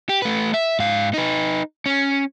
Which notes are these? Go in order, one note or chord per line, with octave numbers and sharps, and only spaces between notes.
G4
A3 B4
E5
G#2 F5
D#4 B4
C#4